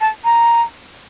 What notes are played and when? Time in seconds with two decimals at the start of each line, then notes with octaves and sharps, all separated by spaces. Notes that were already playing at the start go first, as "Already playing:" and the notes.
0.01 A5
0.24 A#5